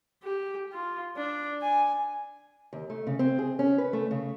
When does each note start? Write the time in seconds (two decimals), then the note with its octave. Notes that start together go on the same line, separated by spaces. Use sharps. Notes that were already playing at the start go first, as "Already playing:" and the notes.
0.23 G4
0.72 F4
1.17 D4
1.62 G#5
2.73 D#2
2.90 A3
3.07 C#3
3.19 C4
3.39 G#4
3.59 C#4
3.78 B4
3.93 A3
4.11 C#3